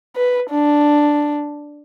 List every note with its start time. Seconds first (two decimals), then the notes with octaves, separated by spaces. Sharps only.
0.16 B4
0.50 D4